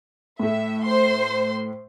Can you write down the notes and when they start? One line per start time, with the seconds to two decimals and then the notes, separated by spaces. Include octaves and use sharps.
0.39 A2 A3 E5
0.83 C5 C6